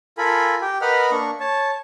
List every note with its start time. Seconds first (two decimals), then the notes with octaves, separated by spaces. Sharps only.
0.18 F4 A4 A#4 G#5 B5
0.62 G4 G5
0.81 A#4 B4 D#5 F#5 B5 F6
1.11 A#3 D4 C#6
1.40 C#5 A5